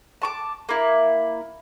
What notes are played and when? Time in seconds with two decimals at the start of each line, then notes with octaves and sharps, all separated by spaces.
0.22 A5 C#6 D6
0.69 A#3 E4